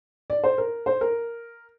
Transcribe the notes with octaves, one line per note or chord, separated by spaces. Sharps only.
D5
C5
A#4
C5
A#4